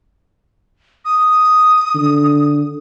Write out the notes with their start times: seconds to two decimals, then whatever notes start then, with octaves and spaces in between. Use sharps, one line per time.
1.05 D#6
1.95 D3